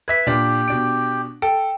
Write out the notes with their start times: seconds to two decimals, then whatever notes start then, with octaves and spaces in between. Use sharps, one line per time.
0.08 B4 E5 G#6 B6
0.27 A#2 D4 G4
0.68 B2 D4 D7
1.42 A4 G5